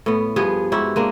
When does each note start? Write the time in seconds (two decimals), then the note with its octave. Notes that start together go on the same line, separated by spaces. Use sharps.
0.06 A2 B3
0.36 G2 F3 B3 G#4
0.72 G#2 E4 F#4 G4
0.96 G#3 A#3 D4